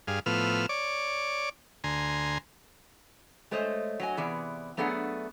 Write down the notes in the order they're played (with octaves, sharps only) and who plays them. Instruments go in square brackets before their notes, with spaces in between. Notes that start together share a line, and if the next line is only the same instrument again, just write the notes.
[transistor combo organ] G2 G#4 F5
A2 F3 B3 E6 F6
C#5 D5 D6
D2 G#5 A#5 C6
[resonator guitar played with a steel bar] G#3 A3 C5 C#5 D#5
F#3 D#5 G#5
C3 E3 B3 G#4 D5
F#3 A3 B3 D4 G#4 F#5